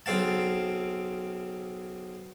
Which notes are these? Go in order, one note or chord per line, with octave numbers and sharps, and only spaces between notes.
B1 C#3 C4 F5 A5